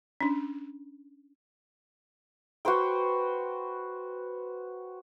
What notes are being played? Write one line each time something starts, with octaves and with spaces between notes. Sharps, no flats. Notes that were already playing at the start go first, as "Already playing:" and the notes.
C#4 D4
F#4 B4 C5 G5